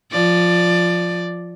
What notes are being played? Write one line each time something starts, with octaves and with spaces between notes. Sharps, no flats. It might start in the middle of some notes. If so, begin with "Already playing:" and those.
F3 D5